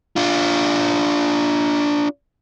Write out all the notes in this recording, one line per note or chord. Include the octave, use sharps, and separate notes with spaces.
D4 F4